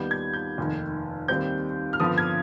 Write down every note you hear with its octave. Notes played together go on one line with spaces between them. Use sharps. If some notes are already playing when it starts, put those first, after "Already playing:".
Already playing: D#2 D#3 G3 B3 G6
G#6
G6
F1 D#2 D#3
D#2 D#3 G3 C4 G6
F6
G2 D3 F3 B3 D#6
G#6